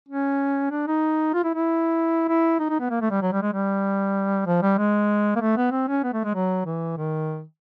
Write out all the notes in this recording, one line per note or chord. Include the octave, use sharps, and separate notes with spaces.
C#4
D4
D#4
F4
E4
E4
E4
D#4
D#4
B3
A#3
A3
G3
F#3
G3
G#3
G3
F3
G3
G#3
A#3
A3
B3
C4
C#4
B3
A3
G#3
F#3
E3
D#3